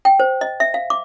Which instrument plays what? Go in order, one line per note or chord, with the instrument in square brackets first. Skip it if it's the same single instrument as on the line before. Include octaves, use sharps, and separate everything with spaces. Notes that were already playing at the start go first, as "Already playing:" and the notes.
[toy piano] G5
C5
D#5
E5
F5
D6